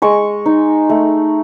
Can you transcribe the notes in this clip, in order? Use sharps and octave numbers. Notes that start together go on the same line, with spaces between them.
G#3 C#6
D#4
A3